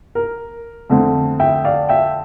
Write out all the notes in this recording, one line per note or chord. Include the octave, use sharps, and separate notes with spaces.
A#4
F2 D3 A3 C4
E5 G5
D5 F5
E5 G5